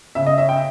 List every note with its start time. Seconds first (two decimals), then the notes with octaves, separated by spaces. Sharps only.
0.15 C#3 E5
0.26 D#5
0.38 C#4 E5
0.49 G5